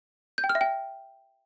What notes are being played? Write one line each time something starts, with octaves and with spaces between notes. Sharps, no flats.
G6
G5
F6
E5
G5